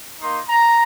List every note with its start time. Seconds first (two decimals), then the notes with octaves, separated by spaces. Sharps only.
0.19 A#3 D#4 C6
0.47 A#5